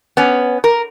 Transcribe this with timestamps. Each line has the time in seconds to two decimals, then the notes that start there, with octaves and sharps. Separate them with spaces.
0.17 B3 C#4
0.64 A#4